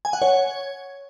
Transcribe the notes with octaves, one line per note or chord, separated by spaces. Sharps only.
G#5
F#5
C#5